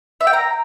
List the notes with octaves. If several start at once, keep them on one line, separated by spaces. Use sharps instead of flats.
E5
G5
A#5